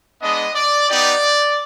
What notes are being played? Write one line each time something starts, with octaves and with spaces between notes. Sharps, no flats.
G#3 B3 D4 D#5
D5
B3 D#4 G4 D5